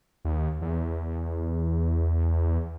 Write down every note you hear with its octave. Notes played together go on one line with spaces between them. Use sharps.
D#2
E2